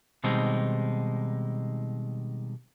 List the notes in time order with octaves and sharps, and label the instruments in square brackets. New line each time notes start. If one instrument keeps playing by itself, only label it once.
[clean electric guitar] B2 D#3 G3 G#3 C4 D#4